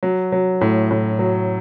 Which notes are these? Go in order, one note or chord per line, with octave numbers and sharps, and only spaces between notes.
F#3
F#3
A2
A2
F#3